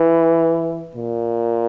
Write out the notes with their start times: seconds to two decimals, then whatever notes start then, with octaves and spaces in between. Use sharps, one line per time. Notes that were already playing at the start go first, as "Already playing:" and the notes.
Already playing: E3
0.96 A#2